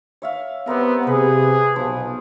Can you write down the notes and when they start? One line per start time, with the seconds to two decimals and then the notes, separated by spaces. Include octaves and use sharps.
0.22 C#5 E5 F5
0.67 G3 B3 C4 A#4
1.07 C3 G#4 B4
1.76 B1 F3